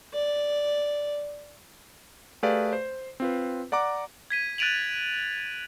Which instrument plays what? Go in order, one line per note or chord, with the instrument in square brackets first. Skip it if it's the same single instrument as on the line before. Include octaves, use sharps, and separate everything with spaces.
[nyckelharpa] D5
[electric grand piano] A3 G4 G#4 B4 D5 F5
C5
C4 F4 B4
D5 F#5 A#5 D6
[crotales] G#6 B6 D#7
F#6 A6 D7 D#7 F7 F#7